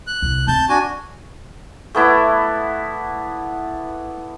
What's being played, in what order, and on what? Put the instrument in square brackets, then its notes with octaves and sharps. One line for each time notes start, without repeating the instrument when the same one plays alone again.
[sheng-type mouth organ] F#6
[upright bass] C2
[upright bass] C4 [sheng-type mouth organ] A5 G6
[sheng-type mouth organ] D4 F#4 G#5
[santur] A3 B3 E4 D5